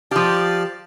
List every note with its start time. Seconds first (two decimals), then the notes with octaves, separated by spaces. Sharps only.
0.11 F3 G4 D5 F5 A5